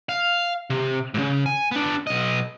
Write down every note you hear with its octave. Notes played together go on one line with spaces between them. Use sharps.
F5
C3
G#2 C#3
G#5
B3 D4
B1 D#5